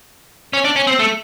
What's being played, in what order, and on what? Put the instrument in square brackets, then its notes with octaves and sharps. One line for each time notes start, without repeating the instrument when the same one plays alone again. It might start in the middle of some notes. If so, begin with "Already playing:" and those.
[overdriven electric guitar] C#4
D4
C#4
C4
A3